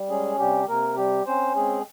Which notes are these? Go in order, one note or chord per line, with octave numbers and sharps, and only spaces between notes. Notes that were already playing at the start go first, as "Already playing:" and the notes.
Already playing: G3
G#3 C#4 G#4
C3 G3 G4
C3 A#3 A#4
G3 G4
C4 C#4 C5
G#3 C4 G#4